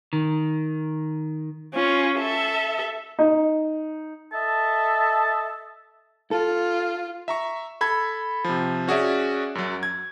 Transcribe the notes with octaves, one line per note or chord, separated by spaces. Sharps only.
D#3
C#4 F4
A4 E5
D#4
A4 D#5 E5 A5
F4 A4
E5 A#5 C#6
A4 B5 G#6
C3 F3
C#4 F#4 G#4 D5 E5
F#2 F#3
G#6